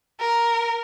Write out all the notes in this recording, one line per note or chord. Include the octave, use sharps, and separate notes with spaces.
A#4